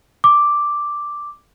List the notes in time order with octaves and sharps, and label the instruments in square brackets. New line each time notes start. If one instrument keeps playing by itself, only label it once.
[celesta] D6